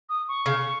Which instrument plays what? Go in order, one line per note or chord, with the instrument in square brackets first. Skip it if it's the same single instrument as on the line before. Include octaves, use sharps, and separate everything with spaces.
[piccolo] D#6
C#6
[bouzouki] C#3